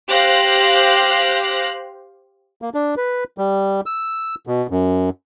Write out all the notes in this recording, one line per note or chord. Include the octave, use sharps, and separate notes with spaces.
G4 C5 F5 F#6 A#6
A#3
D4
B4
G3
E6
B2
F#2